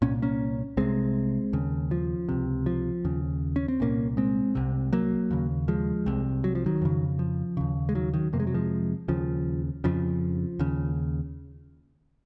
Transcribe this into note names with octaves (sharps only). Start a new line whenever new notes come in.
C2 A#2 C#4
A#3 C#4
C2 C3 G#3 C4
D#2 C#3
F3
C#2 C3
F3
D#2 C#3
C#4
C4
C2 A#2 A#3 C#4
G#3 C4
C2 C3
F#3 A#3
D#2 C#3
F3 G#3
C2 C3
F#3
F3
D#3 F#3
F2 C#3
F3
D#2 C#3
G#3
D#3 F#3
D#3 F#3
F2 C3 A#3
G#3
F#3
F3 G#3
D#2 C#3 F3
F2 C#3 F3
D#2 C#3